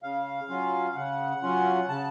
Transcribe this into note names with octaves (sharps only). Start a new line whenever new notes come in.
C#3 F5
F#3 C#4 F4
F5
C#3 F#5
F#3 C#4 F4
C#3 A5